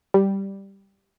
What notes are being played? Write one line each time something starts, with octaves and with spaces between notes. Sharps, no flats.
G3